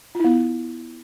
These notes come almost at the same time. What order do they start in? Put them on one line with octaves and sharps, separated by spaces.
F4 E4 B3